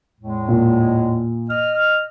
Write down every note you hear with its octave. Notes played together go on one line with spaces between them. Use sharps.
E2 A2 G#3
A#2
D#5 F6